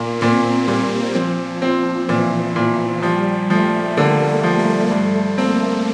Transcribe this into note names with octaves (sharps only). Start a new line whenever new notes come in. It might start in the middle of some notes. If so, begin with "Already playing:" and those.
Already playing: A#2 A#3
A#2 C4
A#2 G3
F3 C4
C4
A#2 E3
A#2
F3 G3
F3 A3
D3 A#3
A#3
F3
A3
G2 A3
A#3 C4